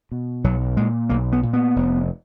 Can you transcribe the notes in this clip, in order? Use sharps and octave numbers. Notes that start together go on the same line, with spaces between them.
B2
B1 F#3
A#2 G#3
B1 A#3
B3
A#2
B3
F1